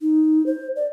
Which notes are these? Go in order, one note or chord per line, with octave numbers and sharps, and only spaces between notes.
D#4
C5
D5